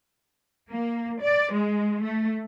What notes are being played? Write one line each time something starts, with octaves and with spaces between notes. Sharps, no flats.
A#3
D5
G#3
A3